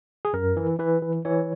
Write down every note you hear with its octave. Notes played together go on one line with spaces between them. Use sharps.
G#4
F#2 A#4
E3
E3 B4
E3
E3 C#5